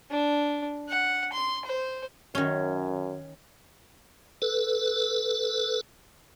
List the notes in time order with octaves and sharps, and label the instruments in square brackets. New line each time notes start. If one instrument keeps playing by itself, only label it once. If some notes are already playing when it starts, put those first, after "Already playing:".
[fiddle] D4
F#5
C6
C5
[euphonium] F#2 [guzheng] D#3 C#4
[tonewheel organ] A4 B4